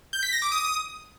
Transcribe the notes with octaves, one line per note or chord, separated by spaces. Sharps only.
G6
B6
A#6
D6
D#6